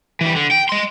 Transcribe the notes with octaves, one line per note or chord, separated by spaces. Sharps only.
E3 G3
D3
G5
D#5 C6